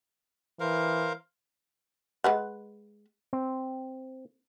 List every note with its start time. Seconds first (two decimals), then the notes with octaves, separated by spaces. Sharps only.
0.60 E3 A#4 C5 F5
2.24 G#3 B4 F#5
3.33 C4